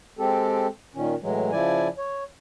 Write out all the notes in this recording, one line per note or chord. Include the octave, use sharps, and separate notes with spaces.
G#3 C4 G4 A4
A#2 D#3 C#4
A2 E3 F#3 G#3
C#3 F3 E4 D5 G#5
C#5